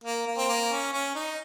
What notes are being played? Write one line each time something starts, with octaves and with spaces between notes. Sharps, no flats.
A#3
A#3
C4
A#3
C#4
C#4
D#4